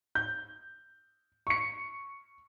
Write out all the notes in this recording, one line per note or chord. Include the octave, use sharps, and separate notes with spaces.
G6
C#6 C#7